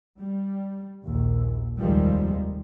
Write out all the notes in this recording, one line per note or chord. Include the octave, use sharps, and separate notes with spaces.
G3
A#1 D#2
F1 D#2 D#3 F3 G3 G#3